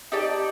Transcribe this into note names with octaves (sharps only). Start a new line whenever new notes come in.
D#4 G4 D5 A5